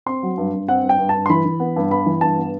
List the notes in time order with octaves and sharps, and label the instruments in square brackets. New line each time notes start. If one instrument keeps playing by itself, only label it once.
[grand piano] C4 C6
F#3
G2
G2
C4 F#5
G2
G5
G2
A5
G2
C6
E3 B5
E3
B3
G2
B3 B5
E3
G2 A5
B3